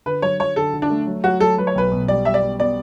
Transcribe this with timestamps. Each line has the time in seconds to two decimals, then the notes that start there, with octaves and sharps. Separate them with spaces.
0.06 D3 B4
0.22 F#3 C#5
0.39 F#3 C#5
0.56 D3 A4
0.73 D3
0.82 D4
0.90 A3
1.07 F#3
1.24 F#3 F#4
1.40 F#3 A4
1.58 F#3 B4
1.67 C#5
1.75 B1 B4
1.92 B2
2.08 G3 D5
2.25 G3 E5
2.34 D5
2.42 B3
2.60 B3 D5